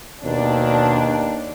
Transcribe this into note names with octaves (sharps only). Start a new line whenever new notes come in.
D#2 B2 D4